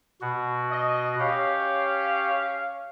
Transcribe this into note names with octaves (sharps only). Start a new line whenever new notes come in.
B2 F#4
D#5
C#4 G4 C#5 F5